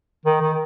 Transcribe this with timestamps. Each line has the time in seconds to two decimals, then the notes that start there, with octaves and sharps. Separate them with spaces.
0.26 D#3
0.41 D#3